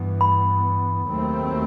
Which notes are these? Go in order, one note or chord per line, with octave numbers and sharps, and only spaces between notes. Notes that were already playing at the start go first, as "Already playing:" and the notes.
Already playing: G2 E3 B3
B5
D#2 D#3 F#3 A3 C4